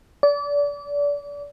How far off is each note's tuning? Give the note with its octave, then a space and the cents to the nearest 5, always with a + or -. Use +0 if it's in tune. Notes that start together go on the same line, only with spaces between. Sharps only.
D5 -30